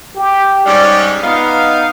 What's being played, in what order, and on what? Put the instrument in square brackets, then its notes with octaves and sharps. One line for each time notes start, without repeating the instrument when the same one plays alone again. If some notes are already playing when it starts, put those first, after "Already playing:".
[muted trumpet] G4
[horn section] G#2 G3 C#4 [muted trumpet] D5
[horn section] B3 F5 [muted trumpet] D#4